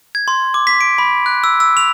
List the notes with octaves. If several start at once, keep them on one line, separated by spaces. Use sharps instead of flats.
G#6
C6
D6
B6
D7
B5
F#6
E6
E6
F7